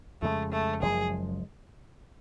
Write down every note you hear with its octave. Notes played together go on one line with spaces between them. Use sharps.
F2 C#3 G#3 A3
A3
F#1 F#2 F3 G#3 G#4